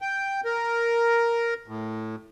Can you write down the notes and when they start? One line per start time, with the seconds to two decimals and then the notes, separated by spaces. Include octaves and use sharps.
0.01 G5
0.45 A#4
1.68 A2